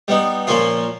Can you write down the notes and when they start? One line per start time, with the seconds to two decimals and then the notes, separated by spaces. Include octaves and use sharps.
0.08 G3 B3 D#4
0.47 A#2 F3 A#3 C#4 F4